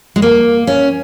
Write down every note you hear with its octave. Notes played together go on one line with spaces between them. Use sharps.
G#3
A#3
C#4